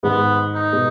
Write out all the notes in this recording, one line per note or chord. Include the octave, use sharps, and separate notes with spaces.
G#2 D#3 G#3 B3
D#4
B2 G#3